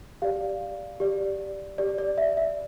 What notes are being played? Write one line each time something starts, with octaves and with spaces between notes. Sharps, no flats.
G4 D5 F5
G4 D5
G4 D5
D5
E5
E5